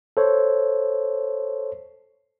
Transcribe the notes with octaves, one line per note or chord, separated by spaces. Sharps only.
A4 C5 C#5